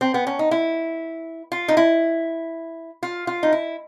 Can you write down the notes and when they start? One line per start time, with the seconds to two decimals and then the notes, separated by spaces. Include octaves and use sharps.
0.01 C4
0.14 B3
0.27 C#4
0.39 D#4
0.51 E4
1.52 F4
1.68 D#4
1.77 E4
3.03 F4
3.27 F4
3.43 D#4
3.53 E4